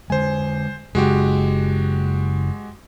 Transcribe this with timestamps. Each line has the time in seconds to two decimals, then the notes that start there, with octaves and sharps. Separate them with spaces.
0.10 D3 G#3 C5 G#5
0.95 F#2 C#3 G#3 F#4 G4